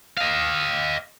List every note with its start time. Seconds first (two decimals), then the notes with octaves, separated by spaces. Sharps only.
0.18 D#5 F5